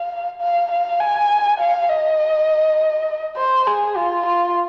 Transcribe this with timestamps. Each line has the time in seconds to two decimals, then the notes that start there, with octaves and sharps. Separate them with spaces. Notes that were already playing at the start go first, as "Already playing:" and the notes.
Already playing: F5
0.41 F5
0.71 F5
1.01 G#5
1.60 F5
1.89 D#5
3.37 C5
3.67 G#4
3.97 F4
4.26 F4